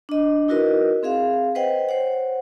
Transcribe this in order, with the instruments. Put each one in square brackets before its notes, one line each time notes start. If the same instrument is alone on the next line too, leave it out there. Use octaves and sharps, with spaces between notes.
[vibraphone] D4 D#5
D#4 E4 F#4 A#4 B4 D#5
C4 G#4 E5 F5
B4 C5 D#5 F#5 G5
C5 C#5 F#5